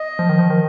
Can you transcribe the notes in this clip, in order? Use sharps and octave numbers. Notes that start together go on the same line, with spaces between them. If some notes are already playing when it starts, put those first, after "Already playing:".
Already playing: D#5
F3
D#3
F3
D#3